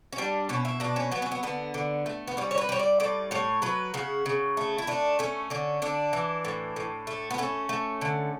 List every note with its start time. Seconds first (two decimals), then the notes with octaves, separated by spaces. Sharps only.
0.13 C#4
0.18 G3 D4
0.49 B2 C#4
0.65 E4
0.80 B2 D4
0.96 C#4
1.11 F#3 B3
1.22 C#4
1.32 B3
1.43 D3 B3
1.74 D3
2.06 A3
2.27 B3
2.37 G3 C#4
2.51 C#5
2.58 B4
2.69 G3 C#5
2.79 D5
3.00 A2 D5
3.31 A2 C#5
3.62 F#3 B4
3.94 C#3 F#4
4.26 C#3
4.57 A3
4.78 E4
4.87 A3 D4
5.19 A3 C#4
5.50 D3 C#4
5.82 D3 D4
6.13 E3
6.45 A2
6.76 A2
7.07 A3
7.31 B3
7.38 A3 C#4
7.69 A3
8.01 D3